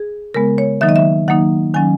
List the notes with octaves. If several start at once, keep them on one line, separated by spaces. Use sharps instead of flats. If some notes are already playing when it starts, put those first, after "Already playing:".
Already playing: G#4
C#3 G#3 B3 A#4
C#5
D#3 F#3 A#3 D#4 E5
D#5
E5
D#3 F#3 A#3 D#4 F#5
D#3 F#3 C#4 G#5